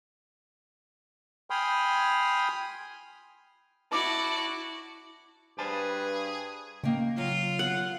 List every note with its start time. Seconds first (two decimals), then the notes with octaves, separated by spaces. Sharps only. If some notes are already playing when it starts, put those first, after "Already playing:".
1.50 G5 G#5 B5 C6 D#6 F6
3.91 E4 F#4 D5 A5 D6
5.59 G2 G#4 B4 C5 G#5 A5
6.84 C#3 A#3 D#5 G5
7.18 F#3 F4
7.59 F#5